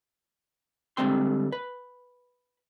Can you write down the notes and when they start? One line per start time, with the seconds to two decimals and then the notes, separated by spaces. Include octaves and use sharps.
0.97 D3 G3 G#3 C4 G5 C6
1.52 B4